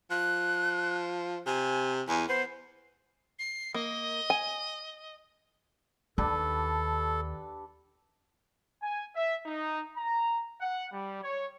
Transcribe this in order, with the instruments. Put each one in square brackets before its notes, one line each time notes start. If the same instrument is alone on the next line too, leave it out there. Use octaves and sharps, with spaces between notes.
[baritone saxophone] F3 [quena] F#6
[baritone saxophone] C3 [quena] G#5
[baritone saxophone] E2 [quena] G#5
[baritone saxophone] B3 [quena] C5
[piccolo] C7
[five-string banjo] A#3 [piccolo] D#5
[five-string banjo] G#5
[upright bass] D#2 [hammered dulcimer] D4 G4 B4 [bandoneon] A4
[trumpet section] G#5
E5
D#4
A#5
F#5
G3
C#5